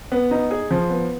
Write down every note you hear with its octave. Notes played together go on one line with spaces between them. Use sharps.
B3
D#4
G#4
F3
B3